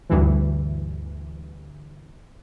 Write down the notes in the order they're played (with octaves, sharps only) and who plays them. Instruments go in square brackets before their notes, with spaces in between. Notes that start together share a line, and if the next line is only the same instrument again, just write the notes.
[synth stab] D2 G2 E3